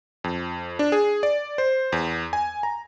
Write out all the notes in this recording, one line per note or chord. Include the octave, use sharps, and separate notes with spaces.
F2
D4
G#4
D5
C5
E2
G#5
A#5